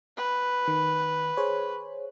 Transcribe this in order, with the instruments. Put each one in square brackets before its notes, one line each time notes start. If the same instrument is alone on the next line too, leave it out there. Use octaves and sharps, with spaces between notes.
[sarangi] B4
[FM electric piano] D#3
G#4 C5 C#5